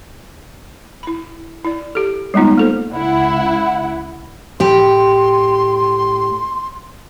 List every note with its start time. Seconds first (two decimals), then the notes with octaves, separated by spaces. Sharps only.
1.03 E4 B5
1.65 E4 D5
1.95 G4 A4
2.34 G3 G#3 B3 D#4 F4
2.58 A#3 A4 C5
2.94 C#2 E4 F#5
4.60 A2 G4 C6